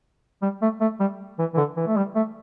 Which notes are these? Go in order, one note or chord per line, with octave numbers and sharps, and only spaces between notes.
G3
A3
A3
G3
E3
E3
D3
E3
A3
G3
A3